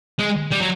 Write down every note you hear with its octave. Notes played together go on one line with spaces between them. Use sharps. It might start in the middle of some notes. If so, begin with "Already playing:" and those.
G#3
G3
F#3